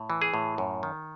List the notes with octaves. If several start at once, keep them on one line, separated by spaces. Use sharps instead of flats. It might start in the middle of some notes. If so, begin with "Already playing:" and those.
Already playing: A2
E3
G#4
A2
F#2
D#3